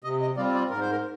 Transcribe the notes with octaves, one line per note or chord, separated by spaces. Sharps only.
C3 D#5
D#5
G3 C4 F4 D5
D5
G#2 A#4
C5
A#4